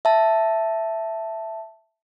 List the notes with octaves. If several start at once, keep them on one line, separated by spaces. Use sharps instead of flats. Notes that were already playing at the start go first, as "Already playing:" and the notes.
E5 A5